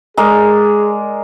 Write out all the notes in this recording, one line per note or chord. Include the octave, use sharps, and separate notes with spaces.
G#3 G#4 A#4 D5